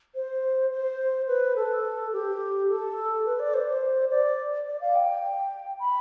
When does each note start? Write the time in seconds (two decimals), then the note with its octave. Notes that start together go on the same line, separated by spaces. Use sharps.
0.15 C5
0.72 C5
1.28 B4
1.56 A4
2.13 G4
2.69 A4
3.26 B4
3.40 D5
3.54 C5
4.10 D5
4.67 D5
4.81 F5
4.95 G5
5.80 B5